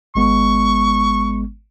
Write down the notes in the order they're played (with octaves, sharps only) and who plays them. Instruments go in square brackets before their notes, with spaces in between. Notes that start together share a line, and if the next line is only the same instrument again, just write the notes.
[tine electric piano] G#1 G#3 B3 [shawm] C#6